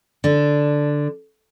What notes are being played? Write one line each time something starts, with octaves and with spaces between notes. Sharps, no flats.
D3 D4